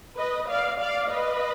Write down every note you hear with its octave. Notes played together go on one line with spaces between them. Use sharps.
B4 D#5
D5 F5
D5 F5
B4 D#5